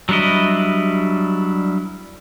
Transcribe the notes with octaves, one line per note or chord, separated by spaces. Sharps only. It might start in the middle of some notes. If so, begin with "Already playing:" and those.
F#3 G3 D4 E4 D#5